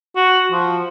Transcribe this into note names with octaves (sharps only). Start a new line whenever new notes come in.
F#4
F3